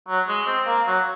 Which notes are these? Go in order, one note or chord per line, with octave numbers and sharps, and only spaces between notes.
F#3
G#3
C4
A#3
F#3